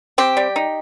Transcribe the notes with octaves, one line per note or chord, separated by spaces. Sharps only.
C4 G4
G3
D#4